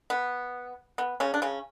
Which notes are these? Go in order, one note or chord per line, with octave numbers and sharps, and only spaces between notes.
B3
B3
C#3 C#4
D4
C#3 C#4